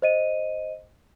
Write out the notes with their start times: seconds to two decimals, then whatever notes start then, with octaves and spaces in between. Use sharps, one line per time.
0.02 C5 D#5 D#7